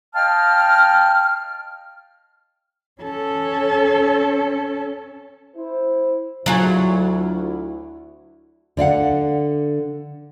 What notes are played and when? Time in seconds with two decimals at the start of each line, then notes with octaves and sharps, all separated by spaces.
0.15 D#5 F5 G5 A5 F6
3.02 C#4 A4
5.55 E4 C5
6.46 D2 F#3 E4 F4 G#4
8.77 D3 D5 F5 F#5